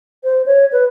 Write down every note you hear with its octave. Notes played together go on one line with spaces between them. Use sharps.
C5
C#5
B4